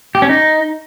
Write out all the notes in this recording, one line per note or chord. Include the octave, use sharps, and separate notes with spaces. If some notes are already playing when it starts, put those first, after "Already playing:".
G4
C#4
D#4